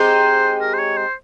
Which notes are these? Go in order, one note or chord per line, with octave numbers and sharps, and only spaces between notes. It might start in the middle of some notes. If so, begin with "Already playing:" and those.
Already playing: G#3 C4 D#4 G4 C5
A#4
C5
C#5
C5